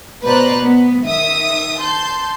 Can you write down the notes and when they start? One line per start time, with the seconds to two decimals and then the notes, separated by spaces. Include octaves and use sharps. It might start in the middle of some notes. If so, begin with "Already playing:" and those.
0.25 B2 B4 C5 D5 A#5 F#6
0.62 B3
1.04 D#3 E5 D#6
1.79 A5 C6 G6